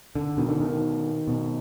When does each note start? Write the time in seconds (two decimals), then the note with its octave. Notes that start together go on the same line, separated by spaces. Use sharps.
0.15 D3
0.37 B2 D#3
0.49 D3
0.60 D#3
1.28 B2